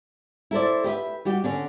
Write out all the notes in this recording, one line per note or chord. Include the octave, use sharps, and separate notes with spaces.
E4 A4 C5 D5
G4 B4 D#5 E5
G3 F#4 G4
D3 C#4 D4